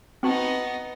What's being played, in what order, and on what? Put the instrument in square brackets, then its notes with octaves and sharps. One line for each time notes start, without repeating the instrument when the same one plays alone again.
[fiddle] B3 D#4 [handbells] C4 F#4 A5